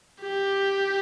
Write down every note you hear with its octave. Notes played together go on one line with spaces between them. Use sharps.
G4